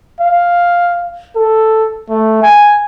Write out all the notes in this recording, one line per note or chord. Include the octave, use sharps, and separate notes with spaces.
F5
A4
A3
G#5